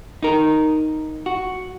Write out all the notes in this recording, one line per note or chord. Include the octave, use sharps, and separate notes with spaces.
D#4 A#4
F#4